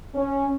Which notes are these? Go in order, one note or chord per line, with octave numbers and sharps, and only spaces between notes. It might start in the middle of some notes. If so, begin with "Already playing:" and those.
C#4